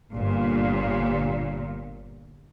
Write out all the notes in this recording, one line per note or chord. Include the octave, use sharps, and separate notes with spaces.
G1 A#2